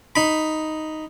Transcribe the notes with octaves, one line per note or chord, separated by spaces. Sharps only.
D#4 B5